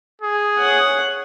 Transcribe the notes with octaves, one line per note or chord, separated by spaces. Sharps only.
G#4
C#5 F#5